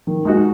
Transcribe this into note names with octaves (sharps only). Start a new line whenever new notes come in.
D#3
G#3 D#4 F#4